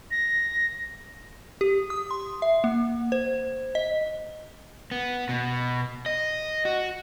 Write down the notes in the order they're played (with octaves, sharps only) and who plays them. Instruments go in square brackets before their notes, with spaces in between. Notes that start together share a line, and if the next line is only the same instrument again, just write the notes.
[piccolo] A#6
[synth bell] G4
D#6
C6
E5
A#3
C5
D#5
[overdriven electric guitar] B3
B2
D#5
F#4